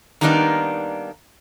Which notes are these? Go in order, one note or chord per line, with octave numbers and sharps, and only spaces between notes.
D#3 G3 A#3 B3 D4 D#4